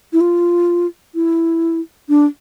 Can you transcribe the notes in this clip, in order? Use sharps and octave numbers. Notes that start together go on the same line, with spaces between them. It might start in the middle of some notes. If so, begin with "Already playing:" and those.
E4
F4
E4
D4